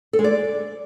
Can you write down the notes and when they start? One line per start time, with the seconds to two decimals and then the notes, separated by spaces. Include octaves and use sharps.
0.13 A4
0.19 G#3
0.24 D5